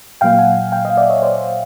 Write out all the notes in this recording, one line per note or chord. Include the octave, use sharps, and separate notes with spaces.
A#2 F#3 A#3 F5 G5
F#5 G#5
F5 G5
D#5 F5
D5 E5
C#5 D#5
C5 D5